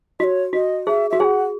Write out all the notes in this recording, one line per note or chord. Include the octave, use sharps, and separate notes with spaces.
F#4 C#5 D#5
F#4 D#5
G#4 E5
F#4 E5
G#4 F#5 G#5